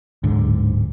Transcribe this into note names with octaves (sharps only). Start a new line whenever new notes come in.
D1 G#2 D3